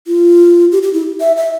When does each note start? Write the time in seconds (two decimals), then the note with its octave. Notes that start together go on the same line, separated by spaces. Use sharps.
0.07 F4
0.72 G4
0.83 G4
0.93 E4
1.20 E5
1.36 E5